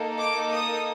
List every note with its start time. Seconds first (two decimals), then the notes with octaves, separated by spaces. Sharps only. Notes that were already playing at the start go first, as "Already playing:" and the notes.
Already playing: A#3 D#4 A4
0.17 D6
0.53 D#6